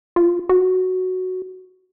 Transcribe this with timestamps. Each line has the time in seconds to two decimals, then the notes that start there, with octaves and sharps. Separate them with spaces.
0.16 F4
0.49 F#4